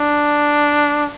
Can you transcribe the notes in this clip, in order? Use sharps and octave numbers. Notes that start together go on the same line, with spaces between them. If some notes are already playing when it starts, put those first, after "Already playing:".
Already playing: D4